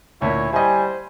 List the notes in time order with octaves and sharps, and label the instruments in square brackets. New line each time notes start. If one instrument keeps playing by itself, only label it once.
[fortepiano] D2 A#2 [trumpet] E4 [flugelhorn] C#5
[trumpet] G3 [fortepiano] E4 D#5 [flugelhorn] C5 [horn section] G#5